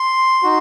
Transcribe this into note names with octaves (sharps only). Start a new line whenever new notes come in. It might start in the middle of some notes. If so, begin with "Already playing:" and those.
Already playing: C6
D#4 F#4